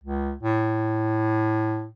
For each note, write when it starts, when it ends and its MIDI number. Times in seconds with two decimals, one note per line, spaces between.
0.04 0.32 37
0.43 1.88 45